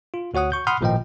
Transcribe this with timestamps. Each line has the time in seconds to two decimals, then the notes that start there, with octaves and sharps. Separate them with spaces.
0.14 F4
0.34 D2 F#4 C#5 F#5 D#6
0.52 C#6 G6
0.67 F#5 B5 C6 D#6 F6
0.81 G#1 A#2 F3 A#3 D#5 G5